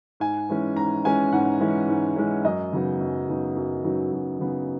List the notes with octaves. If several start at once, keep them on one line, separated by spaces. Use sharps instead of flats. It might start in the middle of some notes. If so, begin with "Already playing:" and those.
G#2 G#5
E3 G#3 C#4
G#2 A#5
E3 G#3 C#4 G#5
G#2 F#5
E3 G#3 C#4
G#2
E3 G#3 C#4
F#2 D#5
C#3 F#3 B3 D#4
F#2
C#3 F#3 B3 D#4
F#2
C#3 F#3 B3 D#4
F#2
C#3 F#3 B3 D#4